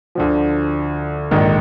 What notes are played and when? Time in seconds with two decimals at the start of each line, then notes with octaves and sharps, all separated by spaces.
0.15 D2 D3 F3
1.31 A#1 G#2 D#3